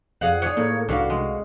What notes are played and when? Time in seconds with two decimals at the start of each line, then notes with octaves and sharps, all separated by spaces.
0.21 F2 G#4 F5 F#5
0.42 G#4 C#5 F#5
0.57 A2 A#3
0.89 C2 G2 C#4 F#4 F5
1.10 G#3